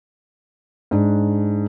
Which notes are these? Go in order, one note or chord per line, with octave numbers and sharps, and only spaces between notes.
G#2 D4